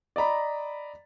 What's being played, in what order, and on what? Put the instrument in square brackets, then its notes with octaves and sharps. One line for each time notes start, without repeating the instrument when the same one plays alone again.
[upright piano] D5 D#5 A#5 B5